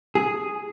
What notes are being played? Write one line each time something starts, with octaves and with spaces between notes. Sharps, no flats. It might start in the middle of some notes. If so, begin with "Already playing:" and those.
G#4